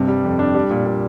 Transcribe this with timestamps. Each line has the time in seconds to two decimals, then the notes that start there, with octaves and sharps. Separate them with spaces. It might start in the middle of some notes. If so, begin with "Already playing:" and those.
Already playing: G2 C3
0.08 G3
0.25 F2
0.39 D4
0.55 G3
0.70 A#2
0.86 A#2